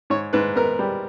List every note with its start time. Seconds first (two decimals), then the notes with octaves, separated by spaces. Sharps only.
0.10 G#2 C#5
0.33 G#2 B4
0.56 B3 A#4
0.79 G3